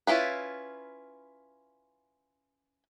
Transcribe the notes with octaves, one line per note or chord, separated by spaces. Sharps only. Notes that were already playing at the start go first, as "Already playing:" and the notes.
C#4 E4 F4 B4